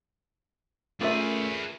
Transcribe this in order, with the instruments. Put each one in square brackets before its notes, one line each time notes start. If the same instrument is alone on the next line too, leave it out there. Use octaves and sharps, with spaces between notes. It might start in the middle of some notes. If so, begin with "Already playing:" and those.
[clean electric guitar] A3 [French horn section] C#4 [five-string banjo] F4 A#4 E5 [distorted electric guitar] G#4 B4